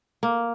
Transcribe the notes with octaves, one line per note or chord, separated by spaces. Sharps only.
A#3